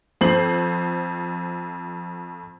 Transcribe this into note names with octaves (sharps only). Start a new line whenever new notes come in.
F2 C5 C7 F#7